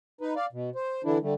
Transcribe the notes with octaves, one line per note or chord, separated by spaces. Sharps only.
D#4 B4
D5 F5
B2
C5
D3 E3 D4 E4
D3 G3 A3